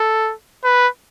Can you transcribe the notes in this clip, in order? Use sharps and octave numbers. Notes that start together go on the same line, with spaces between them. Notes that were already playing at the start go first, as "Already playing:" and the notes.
Already playing: A4
B4